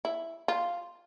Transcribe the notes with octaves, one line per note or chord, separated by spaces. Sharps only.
E4
F4